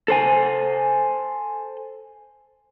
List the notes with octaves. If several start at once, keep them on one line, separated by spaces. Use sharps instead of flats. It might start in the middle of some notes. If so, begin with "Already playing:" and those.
A4 C5 G#5